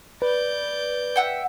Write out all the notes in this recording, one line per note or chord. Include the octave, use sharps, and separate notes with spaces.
B4 D5 G6
E5 F#5 G5